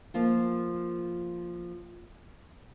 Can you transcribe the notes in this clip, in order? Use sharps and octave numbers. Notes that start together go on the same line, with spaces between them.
F3 A#3 F4